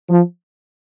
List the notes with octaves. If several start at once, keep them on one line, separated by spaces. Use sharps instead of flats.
F3